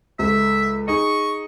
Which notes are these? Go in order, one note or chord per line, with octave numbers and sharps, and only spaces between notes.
C#2 A3 E5
D#4 G#4 D#5 C#6